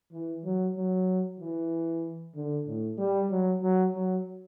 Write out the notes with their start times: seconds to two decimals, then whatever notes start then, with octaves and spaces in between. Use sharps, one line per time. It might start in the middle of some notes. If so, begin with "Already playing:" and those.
0.12 E3
0.44 F#3
0.75 F#3
1.39 E3
2.35 D3
2.66 A2
2.98 G3
3.29 F#3
3.61 F#3
3.94 F#3